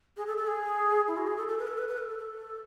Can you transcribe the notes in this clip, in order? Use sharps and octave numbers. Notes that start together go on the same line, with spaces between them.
G#4
A4
A4
G#4
E4
F#4
G#4
A4
A4
B4
A4
B4
B4
A4
A4
A4